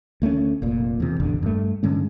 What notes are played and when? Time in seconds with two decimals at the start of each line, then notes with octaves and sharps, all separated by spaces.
0.22 D2 A3 A#3 C#4
0.62 F1 A#2
1.00 E2 C3
1.20 E1 A1 E2 D3
1.43 G2 A3
1.83 G2 D3 G#3 C#4